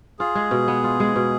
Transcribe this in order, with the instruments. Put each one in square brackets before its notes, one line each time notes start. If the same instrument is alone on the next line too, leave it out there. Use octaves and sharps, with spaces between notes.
[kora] F4 [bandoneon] G#4
[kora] G#3
B2
B3
F4
G#3
B2